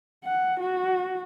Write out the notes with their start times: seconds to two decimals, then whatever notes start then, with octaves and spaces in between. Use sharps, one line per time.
0.24 F#5
0.60 F#4